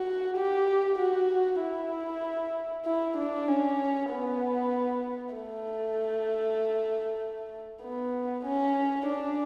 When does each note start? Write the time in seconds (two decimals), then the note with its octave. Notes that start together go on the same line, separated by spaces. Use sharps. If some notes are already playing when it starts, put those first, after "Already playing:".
Already playing: F#4
0.37 G4
0.99 F#4
1.61 E4
2.85 E4
3.17 D4
3.48 C#4
4.10 B3
5.34 A3
7.83 B3
8.46 C#4
9.08 D4